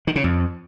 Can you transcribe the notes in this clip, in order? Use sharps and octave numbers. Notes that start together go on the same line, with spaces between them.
D#3
C#3
F2